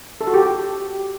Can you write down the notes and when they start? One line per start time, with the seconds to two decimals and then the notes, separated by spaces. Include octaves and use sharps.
0.21 A4
0.27 F#4
0.34 G4